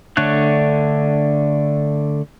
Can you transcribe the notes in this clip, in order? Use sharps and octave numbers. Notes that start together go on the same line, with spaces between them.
D3 A3 D4 C#5 F#6